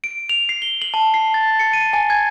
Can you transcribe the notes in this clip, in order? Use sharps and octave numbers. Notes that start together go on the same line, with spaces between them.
D7
F7
C7
G7
F#7
A5
C7
A6
C#7
D#7
G#5
G#6